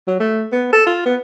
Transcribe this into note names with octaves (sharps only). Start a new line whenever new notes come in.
F#3
A3
B3
A4
F4
B3